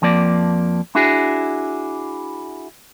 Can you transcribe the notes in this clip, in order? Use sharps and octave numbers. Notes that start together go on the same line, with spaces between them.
F2 F3 A#3 D5
D4 E4 F#4 G#4